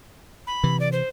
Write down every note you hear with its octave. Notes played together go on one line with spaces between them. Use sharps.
B5
C3 E3
D5
C5